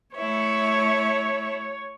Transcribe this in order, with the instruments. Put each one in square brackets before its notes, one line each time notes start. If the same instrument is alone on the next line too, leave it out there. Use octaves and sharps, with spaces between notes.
[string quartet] A3 E4 [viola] C#5